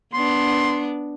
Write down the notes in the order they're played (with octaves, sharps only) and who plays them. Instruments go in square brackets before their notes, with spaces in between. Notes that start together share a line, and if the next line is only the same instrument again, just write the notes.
[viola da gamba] B3 D4 [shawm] C6